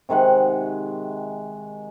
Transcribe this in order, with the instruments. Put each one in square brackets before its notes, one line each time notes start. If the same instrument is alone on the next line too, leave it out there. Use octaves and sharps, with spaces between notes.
[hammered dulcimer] C3 D#3 G#3 F#5